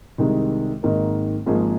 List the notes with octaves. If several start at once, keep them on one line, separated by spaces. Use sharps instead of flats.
C2 C3 D#3 G#3 D#4
G#1 G#2 D#3 A#3
G#1 G#2 F3 A#3 G#4